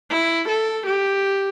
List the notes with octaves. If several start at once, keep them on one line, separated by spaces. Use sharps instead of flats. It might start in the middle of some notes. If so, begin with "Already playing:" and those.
E4
A4
G4